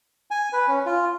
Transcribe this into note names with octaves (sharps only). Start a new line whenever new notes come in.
G#5
B4
C#4
F4